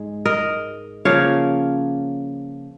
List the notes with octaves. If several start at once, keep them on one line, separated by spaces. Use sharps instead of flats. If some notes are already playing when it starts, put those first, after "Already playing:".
Already playing: G#2 G#3
A#4 D#5
C#3 F3 A#3 C#5 F5